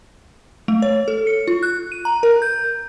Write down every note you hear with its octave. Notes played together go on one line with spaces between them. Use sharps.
A3
C#5
A4
C#7
F4
F#6
D#7
A#5
A#4
G6